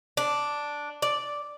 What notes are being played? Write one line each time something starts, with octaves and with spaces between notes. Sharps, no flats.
D4
D5